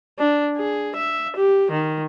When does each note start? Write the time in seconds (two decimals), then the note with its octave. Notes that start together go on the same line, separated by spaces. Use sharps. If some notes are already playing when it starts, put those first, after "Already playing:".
0.19 D4
0.57 G#4
0.96 E5
1.36 G4
1.71 D#3